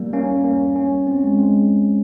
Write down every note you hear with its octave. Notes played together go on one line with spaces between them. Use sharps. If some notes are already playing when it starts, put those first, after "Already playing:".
Already playing: G3 A#3
A#3 C#4
A#3 C#4
A#3 C#4
C4
C#4
G#3 C4
G#3 C4